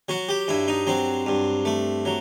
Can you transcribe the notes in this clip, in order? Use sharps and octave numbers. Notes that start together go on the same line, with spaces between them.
F#3 F#4
G4
G2 E4
D#4
F#3 C4
G2
A3
F#3